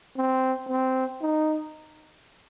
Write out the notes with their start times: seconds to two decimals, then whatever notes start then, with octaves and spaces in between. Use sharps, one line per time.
0.17 C4
0.69 C4
1.21 D#4